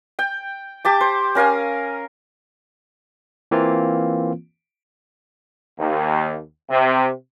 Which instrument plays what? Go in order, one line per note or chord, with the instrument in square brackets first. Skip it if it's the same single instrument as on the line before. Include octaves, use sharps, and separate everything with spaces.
[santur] G5
G4 A5 D6
C5
C#4 A#4 F5 G#5
[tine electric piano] E3 A#3 C4 F4
[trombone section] D#2
C3